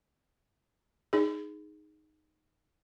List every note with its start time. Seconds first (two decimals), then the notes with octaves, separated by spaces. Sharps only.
1.13 D#4 G#4